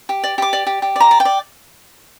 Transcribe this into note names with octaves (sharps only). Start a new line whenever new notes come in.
G4
D5
G4 D6
D5
G4
G4
D5 A#5
D5
G5
D5